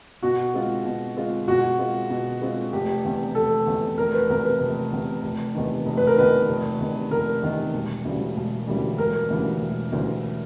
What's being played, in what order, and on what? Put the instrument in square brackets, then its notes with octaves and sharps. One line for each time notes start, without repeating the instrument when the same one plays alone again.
[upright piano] B2 [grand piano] F#4
[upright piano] G#3 C4 F4
B2
G#3 C4 F4
[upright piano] B2 [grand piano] F#4
[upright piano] G#3 C4 F4
B2
G#3 C4 F4
[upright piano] F1 [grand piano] G4
[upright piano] E2 C3
[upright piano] F1 [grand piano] A4
[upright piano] E2 C3
[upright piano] F1 [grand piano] A#4
[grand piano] B4
[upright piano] E2 C3 [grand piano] A#4
[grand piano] B4
[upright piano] F1
E2 C3
F1
E2 C3 D#3
F1
[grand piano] B4
A#4
[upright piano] E2 C3 D#3 [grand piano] B4
[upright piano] F1
E2 C3 D#3
[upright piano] F1 [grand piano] A#4
[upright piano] E2 C3 D#3
E1
D2 C#3 E3 G3
E1
D2 C#3 E3 G3
[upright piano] E1 [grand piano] A#4
[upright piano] D2 C#3 E3 G3
E1
D2 C#3 E3 G3